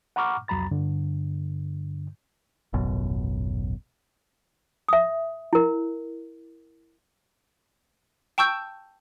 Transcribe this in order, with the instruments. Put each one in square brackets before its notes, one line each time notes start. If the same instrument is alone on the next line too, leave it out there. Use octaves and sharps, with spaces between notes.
[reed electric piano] F#5 A#5 B5 C#6 D6 F6
C2 F2 F#3 A#5 B5 A6
G2 D3
[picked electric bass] D#1 A1 F#2 B2
[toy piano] E5 D#6
E4 A#4
[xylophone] G5 A5 C#6 E6 G6